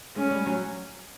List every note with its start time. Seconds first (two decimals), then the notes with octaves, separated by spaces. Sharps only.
0.16 G#3 C#4
0.31 G3
0.46 F#3